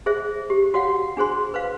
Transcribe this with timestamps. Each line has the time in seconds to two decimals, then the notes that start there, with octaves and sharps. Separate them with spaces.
0.06 G#4 C5 E5
0.50 G4
0.74 F#4 C#5 F5 F#5
1.17 D4 G#4 C5 C6
1.54 B4 C5 F5